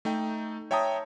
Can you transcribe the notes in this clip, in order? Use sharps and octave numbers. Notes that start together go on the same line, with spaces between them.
A3 D#4 G5
C#5 E5 G5 A5 A#5 D#6